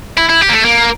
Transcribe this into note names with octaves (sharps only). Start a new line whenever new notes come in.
E4
E4
G4
A#3
A3
A#3